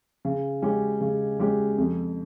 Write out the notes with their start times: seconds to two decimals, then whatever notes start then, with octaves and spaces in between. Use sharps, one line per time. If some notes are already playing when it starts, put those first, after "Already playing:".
0.25 C#3
0.62 G#3 C#4 G4
1.01 C#3
1.39 G#3 C#4 G4
1.78 F2